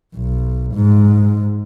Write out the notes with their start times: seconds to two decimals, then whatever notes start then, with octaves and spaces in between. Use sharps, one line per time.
0.16 B1
0.74 G#2